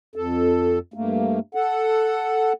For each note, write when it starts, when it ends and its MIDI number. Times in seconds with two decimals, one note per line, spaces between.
0.16 0.79 41
0.16 0.79 69
0.94 1.39 43
0.94 1.39 57
0.94 1.39 58
1.55 2.53 69
1.55 2.53 78